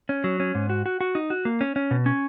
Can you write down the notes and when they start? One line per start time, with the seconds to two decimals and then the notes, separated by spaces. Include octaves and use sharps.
0.09 C#4
0.24 F#3
0.40 C#4
0.55 G#2
0.70 F#4
0.86 F#4
1.01 F#4
1.15 D#4
1.30 F#4
1.45 A#3
1.61 C#4
1.76 C#4
1.91 B2
2.06 C#4